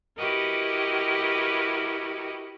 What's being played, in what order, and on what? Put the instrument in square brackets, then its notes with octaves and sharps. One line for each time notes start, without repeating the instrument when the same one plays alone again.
[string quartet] E4 F#4 G4 A#4 B4 D#5